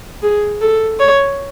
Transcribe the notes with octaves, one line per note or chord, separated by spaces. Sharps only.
G#4
A4
C#5